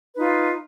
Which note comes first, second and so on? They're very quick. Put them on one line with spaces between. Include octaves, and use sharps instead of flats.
B4 D#4 F4